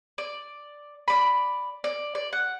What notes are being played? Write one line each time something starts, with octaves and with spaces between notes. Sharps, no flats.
D5
D5 B5
D5
D5
F#5